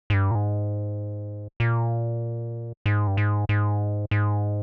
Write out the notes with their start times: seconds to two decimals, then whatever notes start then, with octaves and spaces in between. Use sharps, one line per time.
0.10 G#2
0.14 G2
0.31 A#2
0.35 G#2
1.60 A#2
2.86 G#2
3.07 G2
3.17 G#2
3.49 G#2
4.11 G#2